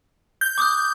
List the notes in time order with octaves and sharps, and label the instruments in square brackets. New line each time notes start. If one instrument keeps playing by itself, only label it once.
[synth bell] G6
[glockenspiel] D6 D#6 F#6